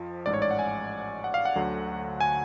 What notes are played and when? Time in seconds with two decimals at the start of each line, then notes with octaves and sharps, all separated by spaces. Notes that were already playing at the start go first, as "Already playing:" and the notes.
Already playing: F2 F3
0.26 A1 G#2 G#3 D5
0.34 C#5
0.42 D5
0.51 F#5
0.59 G#5
1.24 F#5
1.34 F5
1.45 F#5
1.56 D2 D3 F#3
2.21 G#5